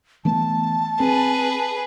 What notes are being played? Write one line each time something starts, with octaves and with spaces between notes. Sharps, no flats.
E3 A3 B3 A5
C4 G#4 B4